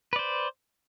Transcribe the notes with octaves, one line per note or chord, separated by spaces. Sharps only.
B4 C5 D5